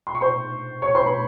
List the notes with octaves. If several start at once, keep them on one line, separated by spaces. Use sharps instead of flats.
C6
C#6
C5 C6
C#5 C#6
C5 C6
B4 B5